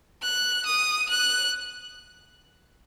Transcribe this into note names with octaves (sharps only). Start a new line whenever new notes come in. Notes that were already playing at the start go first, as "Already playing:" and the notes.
F#6
D#6
F#6